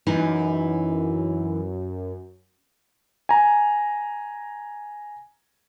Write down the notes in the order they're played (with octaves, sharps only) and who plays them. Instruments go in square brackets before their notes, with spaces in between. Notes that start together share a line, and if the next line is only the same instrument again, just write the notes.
[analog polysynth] F#2 [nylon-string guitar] E3 D#4 E4
[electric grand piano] G#5 A#5